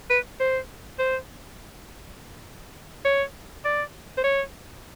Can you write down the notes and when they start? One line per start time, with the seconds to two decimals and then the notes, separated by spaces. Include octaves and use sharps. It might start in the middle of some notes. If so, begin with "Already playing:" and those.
0.10 B4
0.40 C5
0.99 C5
3.05 C#5
3.65 D5
4.17 C5
4.24 C#5